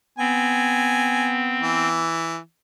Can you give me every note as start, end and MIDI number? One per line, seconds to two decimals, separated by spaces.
0.19 2.07 59
0.19 1.88 60
0.19 1.32 80
1.60 2.38 52